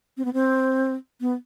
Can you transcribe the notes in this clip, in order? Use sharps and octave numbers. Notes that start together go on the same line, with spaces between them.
C4
B3
C4
B3